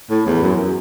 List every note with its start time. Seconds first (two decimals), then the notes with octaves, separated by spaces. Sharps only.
0.10 A2
0.27 E2
0.43 F#2